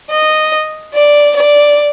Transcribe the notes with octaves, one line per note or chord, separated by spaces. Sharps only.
D#5
D5
D5